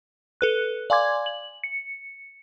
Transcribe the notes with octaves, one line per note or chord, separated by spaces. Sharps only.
A4 B4 F#6
D5 F5 G#5 C6 D6 G#6
F#7
C#7